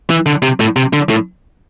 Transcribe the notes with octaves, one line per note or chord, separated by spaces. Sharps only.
E3
D3
C3
A2
C3
D3
A2